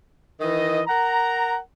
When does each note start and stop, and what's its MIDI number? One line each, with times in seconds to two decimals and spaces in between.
0.41 0.80 51
0.41 0.80 52
0.41 0.80 75
0.87 1.57 70
0.87 1.57 78
0.87 1.57 82